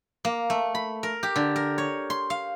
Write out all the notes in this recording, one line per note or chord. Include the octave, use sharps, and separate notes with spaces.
A#3
A3
B5
A#4
G4
D3
A#4
C#5
C6
F5